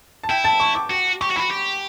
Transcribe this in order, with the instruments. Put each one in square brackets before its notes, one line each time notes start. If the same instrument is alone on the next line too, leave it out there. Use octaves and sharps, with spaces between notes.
[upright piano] A5
[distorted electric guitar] E4 [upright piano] G5
[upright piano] A5
C#6
D6
[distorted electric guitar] F#4
[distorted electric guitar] G4 [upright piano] C#6
[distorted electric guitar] F#4
[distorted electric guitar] E4 [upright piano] B5
[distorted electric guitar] F#4
G4